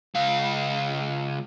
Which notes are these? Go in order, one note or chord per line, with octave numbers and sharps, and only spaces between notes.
C#2 F5